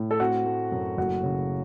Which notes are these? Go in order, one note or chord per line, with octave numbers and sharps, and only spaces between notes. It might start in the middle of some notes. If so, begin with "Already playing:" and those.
Already playing: A2
A4
C4 F#4
A3
F#2
F#1 F#4
C#3